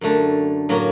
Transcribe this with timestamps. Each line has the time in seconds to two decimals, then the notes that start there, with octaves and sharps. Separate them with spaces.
0.01 F#2 D3 A3
0.69 A2 F#3 A#3 F#4